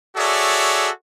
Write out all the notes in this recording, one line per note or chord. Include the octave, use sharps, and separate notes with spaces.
F#4 G#4 A4 C#5 D5 E5